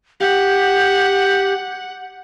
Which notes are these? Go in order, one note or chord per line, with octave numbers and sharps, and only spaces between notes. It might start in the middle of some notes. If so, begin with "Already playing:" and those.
G4 F#5